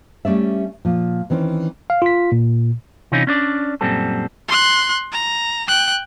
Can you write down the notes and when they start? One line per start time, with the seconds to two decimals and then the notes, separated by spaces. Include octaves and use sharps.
0.25 G3 A3 C#4 D5 E5
0.85 A#2 F3
1.30 D#3 E3 C4 C#4
1.90 F5
2.02 F4 B6
2.32 A#2
3.12 C3 E3 C4 C#4 D#4 F4
3.27 C#4 D4 D5
3.81 F#2 A#2 G3 C4 A4
4.48 C6 F#6
5.13 A#5
5.68 G5 F#6